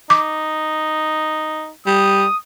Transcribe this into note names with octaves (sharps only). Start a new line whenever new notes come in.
D#4 D6
G3 D#6